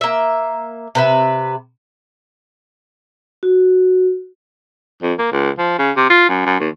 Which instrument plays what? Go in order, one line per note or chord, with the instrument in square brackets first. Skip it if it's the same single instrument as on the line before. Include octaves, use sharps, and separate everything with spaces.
[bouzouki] A#3 E5
C3 B4 E5
[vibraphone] F#4
[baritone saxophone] F2
A#3
C#2
F3
C#3
C3
F4
F#2
F#2
D#2